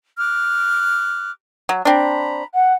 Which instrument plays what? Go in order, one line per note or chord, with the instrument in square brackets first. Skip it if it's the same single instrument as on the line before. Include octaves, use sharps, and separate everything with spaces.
[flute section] D6 F6 F#6
[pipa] F#3
[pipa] C4 D4 [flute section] A#5 B5
[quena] F#5